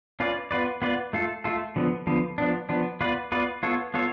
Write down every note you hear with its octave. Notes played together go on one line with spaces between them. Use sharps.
C#4 F4 B4 D5
B3 F4 B4 D5
B3 F4 B4 D5
A3 F4 A4
A3 F4 A4
D3 F3 B3
D3 F3 B3
F3 B3 D4
F3 B3 D4
B3 F4 B4 D5
B3 F4 B4 D5
B3 F4 A4 C#5
B3 F4 A4 C#5